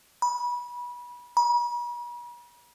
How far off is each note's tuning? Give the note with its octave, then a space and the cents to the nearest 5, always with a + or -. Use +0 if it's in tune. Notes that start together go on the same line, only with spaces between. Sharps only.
B5 -25
B5 -45